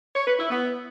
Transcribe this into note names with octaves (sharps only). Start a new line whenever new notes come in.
C#5
B4
E4
B3